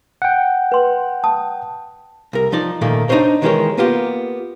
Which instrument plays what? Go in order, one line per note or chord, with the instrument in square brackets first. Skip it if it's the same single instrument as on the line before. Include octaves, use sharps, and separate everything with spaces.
[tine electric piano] F#5 G5
[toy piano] B4 C6
A5 D#6
[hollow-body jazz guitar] C2 A#4
F3 D#4 D5
A#2 D#3 A3 A#3
D4 D#4 F4 A#4 C5 C#5
D#3 E3 G#3 G4 A#4 C#5
A#3 B3 F4 G4